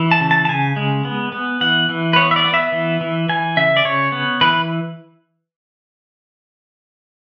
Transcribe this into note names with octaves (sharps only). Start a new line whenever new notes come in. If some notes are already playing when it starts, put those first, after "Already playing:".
Already playing: E3
A5
C#3
A5
A5
C#3 G#5
G#3
B3
B3
E3 F#5
E3
B4
B3 C#5
E5
D5
B3
E5
E3
E3
E3 G#5
C#3 E5
D5
C#3 C#5
B3
E3 B4